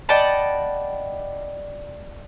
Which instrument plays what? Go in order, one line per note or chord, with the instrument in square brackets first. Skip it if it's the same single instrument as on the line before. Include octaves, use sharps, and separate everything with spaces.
[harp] D5 D#5 F#5 G5 A5 B5